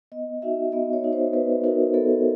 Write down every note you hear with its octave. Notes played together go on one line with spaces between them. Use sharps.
B3 D#5
D#4 F#4 E5
B3 D#5
C#5
D#4 F#4
C5
B3 B4
D#4 F#4 A#4
B3 A4